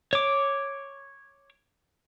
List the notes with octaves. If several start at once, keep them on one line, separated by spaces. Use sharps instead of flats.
C#5 D6